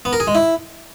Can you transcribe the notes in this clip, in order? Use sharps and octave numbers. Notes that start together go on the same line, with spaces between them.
B3
A#4
G#4
G#3
E4